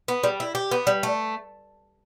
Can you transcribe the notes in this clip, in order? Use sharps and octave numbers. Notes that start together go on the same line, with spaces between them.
B3
G3
E4
G4
B3
G3
A3